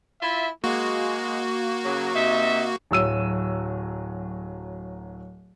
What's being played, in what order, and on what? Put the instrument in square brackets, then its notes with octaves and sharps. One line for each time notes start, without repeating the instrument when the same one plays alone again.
[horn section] E4 F4 E5
[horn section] G#3 [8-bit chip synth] A#3 F#4
[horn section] C#3 F#3
C3 D#4 E5
[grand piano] D1 F#3 E6 D#7